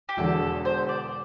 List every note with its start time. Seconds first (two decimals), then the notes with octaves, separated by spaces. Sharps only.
0.09 G4
0.17 E1 E2 D3 A4
0.65 C5
0.89 D5